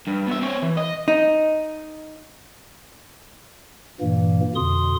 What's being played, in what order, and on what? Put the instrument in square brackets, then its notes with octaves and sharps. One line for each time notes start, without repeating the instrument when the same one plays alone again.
[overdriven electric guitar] G2
B2 E5
C4 C#5
E3
D#5
[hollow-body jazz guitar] D#4
[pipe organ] G2 A#2 E3 A#3
F2 B2 D3 C6 D#6